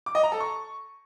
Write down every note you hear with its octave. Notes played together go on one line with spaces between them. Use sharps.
D6
D#5
A#5
A4
C#6